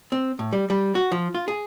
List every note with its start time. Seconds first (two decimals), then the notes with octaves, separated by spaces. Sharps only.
0.12 C4
0.39 A2
0.53 G3
0.70 G3
0.95 F#4
1.12 F3
1.35 F4
1.48 G#4